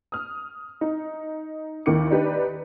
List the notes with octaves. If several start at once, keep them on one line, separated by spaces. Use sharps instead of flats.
D#6 F6
D#4
D#2 D#3 E4 D6 C#7
D4 D#4 G4 B4 D5